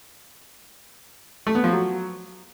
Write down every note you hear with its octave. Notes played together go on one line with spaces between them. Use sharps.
A3
B3
F3
F#3